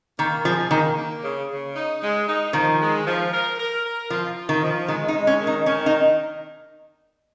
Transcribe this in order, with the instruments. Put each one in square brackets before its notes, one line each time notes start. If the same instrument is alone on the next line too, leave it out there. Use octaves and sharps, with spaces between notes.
[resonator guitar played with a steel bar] D#3 [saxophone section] A#3
[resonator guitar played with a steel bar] F3 [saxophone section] G#4
[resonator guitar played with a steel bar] D#3 [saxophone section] A#3
[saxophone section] A#3
C#3
C#3
D#4
G#3
D#4
[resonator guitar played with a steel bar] D#3 [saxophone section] F3
[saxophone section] G#3
F3
A#4
A#4
A#4
[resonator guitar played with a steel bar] F3 [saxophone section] F4
[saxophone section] F4
[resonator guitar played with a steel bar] D#3
[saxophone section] F3
[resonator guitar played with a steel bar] D#3 [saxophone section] G#3
[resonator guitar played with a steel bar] D#4
[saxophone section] G#3
[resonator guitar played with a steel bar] C#4
[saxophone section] D#3
[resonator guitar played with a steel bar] D#4
[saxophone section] D#3 [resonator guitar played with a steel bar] C#4
[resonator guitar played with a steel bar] D#4